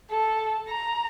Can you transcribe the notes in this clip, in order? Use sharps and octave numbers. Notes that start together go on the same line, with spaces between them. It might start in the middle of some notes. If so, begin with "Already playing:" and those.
A4
A#5